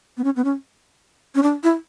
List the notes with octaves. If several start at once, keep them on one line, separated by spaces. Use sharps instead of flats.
B3
C#4
B3
C#4
C#4
D4
E4